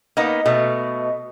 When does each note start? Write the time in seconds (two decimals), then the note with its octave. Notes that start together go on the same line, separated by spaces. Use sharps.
0.17 A#3 B3 D#4 D#5
0.46 B2 A3